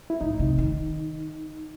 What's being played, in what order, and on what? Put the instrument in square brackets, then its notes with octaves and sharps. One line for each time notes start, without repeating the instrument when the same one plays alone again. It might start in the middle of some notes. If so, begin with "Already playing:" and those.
[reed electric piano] E4
[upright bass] A2 [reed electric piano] D#4
[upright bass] C3
D#3